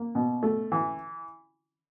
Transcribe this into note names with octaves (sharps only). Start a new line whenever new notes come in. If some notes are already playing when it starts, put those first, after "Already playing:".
Already playing: A#3
B2
A3
E3